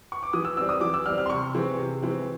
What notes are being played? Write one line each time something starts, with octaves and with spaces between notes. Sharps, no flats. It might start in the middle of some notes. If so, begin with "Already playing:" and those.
C#6
D6
E3 D#6
E6
G3 C4 E6
D#6
E3 D6
E6
G3 C4 F6
F6
C6
C3 C#6
E3 G#3 C4
C3
E3 G#3 C4